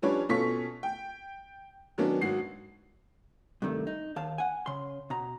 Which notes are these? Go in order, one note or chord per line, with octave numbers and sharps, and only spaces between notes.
F3 G3 C#4 D4 B4 C#5
B2 C#4 F4 A4 C#6 B6
G5
D#3 F#3 A#3 B3 C#4 D4
G#1 F#4 C7
G2 C3 D#3 A3
D#4
D#2 F5 A5
F#5 G#5
C#3 C6
B2 A#5